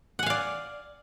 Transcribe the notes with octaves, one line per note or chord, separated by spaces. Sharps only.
D5 F5 F#5 G#5